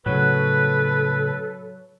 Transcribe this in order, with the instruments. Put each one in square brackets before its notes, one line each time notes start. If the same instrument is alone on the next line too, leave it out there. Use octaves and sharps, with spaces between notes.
[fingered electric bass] A2 C#3 [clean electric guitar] F#3 [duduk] A4 [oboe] B4